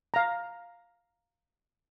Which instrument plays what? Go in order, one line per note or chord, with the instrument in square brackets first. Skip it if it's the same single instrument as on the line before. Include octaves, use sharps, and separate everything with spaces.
[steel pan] F5 A#5